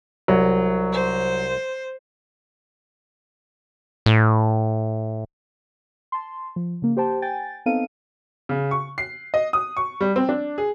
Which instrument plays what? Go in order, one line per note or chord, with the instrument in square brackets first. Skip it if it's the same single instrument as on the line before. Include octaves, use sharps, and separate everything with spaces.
[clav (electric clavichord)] C2 [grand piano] F#3
[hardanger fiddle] C5
[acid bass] A2
[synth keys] A5 C6
F3
C#3 A#3
G4 C5 G5 A5
G5 G#5 A6
B3 C4 D#4 A4 F5 D#7
[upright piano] C#3
C#6
C7
D#5
D#6
C#6
G3
C4
D4
G#4